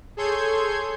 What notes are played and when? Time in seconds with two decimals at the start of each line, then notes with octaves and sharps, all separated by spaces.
0.17 G#4 A4 C#5 C6 G6 G#6